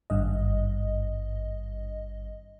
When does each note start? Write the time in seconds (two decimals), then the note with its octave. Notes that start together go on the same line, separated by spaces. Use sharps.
0.10 G#1 G2 D#5